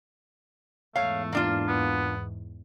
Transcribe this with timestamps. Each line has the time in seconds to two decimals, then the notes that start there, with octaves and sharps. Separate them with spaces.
0.96 E2 G#2 A3 C#5 F5
1.33 A#3 D4 F4
1.68 B3